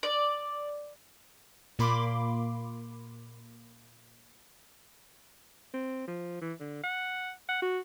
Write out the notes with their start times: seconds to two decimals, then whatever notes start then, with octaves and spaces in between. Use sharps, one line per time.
0.03 D5
1.79 A#2 A#3 B5 C6 D6
5.74 C4
6.07 F3
6.41 E3
6.60 D3
6.83 F#5
7.49 F#5
7.62 F#4